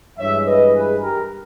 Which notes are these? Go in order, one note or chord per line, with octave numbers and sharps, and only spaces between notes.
G2 E3 G#3 C#5 E5
B4 D#5
G#4 B4
G4 A#4